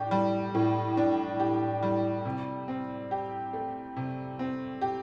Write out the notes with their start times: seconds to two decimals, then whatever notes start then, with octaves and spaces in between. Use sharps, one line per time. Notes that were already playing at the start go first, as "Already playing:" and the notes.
Already playing: A2 D4 G4
0.11 G3
0.55 A2
0.97 D4
1.40 G4
1.83 G3
2.25 C3
2.68 C4
3.11 G4
3.53 A3
3.96 C3
4.39 C4
4.81 G4